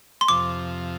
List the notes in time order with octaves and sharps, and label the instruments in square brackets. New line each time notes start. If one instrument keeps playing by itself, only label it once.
[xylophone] C6
[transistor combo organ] F2 C3 F3 [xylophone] D6